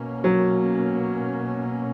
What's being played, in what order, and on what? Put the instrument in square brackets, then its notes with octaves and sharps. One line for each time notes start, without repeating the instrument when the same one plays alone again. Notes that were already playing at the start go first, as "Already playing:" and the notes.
Already playing: [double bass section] B2 A#3 C#4
[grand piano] F#3